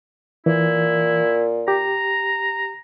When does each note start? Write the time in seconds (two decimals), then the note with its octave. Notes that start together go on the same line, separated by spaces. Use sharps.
0.46 A#2 E3 E4
1.68 G4 A#5